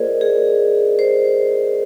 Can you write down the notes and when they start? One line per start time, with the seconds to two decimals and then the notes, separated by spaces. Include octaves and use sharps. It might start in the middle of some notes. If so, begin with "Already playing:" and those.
Already playing: A#3 F4 G#4 A#4 C5 D5 D#5
0.21 G#4
0.99 C5